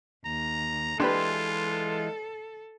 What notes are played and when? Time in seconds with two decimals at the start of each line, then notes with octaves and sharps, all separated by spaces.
0.25 D#2 A#5
1.00 E3 G#3 D4 F4 G4 A4 B4 C6